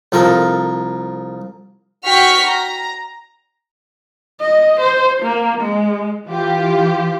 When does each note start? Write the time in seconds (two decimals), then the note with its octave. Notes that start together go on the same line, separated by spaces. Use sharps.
0.12 C2 F3 A4 A#4 C6
2.05 F#4 G5 C#6 F6 B6
2.46 A#5
4.41 D#5
4.80 C5
5.23 A#3
5.61 G#3
6.26 E3 F4 G4